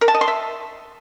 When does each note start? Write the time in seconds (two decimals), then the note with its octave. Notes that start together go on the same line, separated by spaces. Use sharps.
0.01 A#4
0.08 A5
0.14 D#5
0.21 C6
0.28 E5